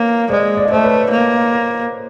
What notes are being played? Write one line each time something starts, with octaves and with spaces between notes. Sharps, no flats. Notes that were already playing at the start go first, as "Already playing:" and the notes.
Already playing: A#3 B4 C#5
G#3 C5 D5
D5
D#5
A3 C5 D5
B4 C#5
A#3